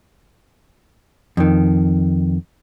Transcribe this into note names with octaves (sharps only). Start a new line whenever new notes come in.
F2 D#3